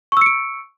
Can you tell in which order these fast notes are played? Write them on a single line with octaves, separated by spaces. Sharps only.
C#6 E6 C#7 D7